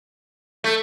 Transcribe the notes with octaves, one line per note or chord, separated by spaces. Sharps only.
A3